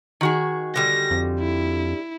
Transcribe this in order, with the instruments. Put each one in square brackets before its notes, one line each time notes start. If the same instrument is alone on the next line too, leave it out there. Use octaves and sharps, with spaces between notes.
[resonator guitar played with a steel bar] D#3 F#4 G#4
[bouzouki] D3 G3 [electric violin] A#6
[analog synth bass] F2
[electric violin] E4